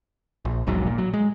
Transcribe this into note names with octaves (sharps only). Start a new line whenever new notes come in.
A#1
E1 A#1 G#2 F#3
A#2
F#3
G#3